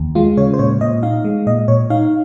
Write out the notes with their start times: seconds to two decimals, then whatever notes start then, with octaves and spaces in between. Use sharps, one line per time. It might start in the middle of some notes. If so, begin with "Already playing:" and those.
Already playing: D#2
0.15 G#3 F4
0.37 C#3 C#5
0.53 C5
0.59 A#2 C#5
0.81 A#2 D#5
1.03 D#4 F5
1.25 G#3
1.47 A#2 D#5
1.68 A#2 C#5
1.90 D#4 F5